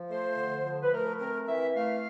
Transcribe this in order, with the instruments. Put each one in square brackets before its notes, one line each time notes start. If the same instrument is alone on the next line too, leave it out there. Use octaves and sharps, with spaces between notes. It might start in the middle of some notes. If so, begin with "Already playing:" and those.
Already playing: [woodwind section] F3
A3 C5
D3
F3
B4
A3 A#4
C4 A#4
E3 E5
A3 F5